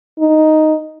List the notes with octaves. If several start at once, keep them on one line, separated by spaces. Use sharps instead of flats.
D#4